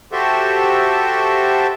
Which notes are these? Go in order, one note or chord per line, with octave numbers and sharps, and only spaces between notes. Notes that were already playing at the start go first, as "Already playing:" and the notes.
F#4 G4 A4 C5 E5